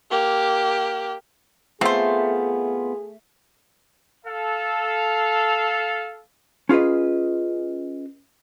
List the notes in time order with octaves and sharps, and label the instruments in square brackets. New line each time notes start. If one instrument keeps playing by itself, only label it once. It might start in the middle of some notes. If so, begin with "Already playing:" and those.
[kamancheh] A#3 G4
[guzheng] A3 [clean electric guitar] B3 F4 [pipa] C4 C5 [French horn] G#4
[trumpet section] A4 F5
[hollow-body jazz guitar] C#4 F4 G#4 B4 D#5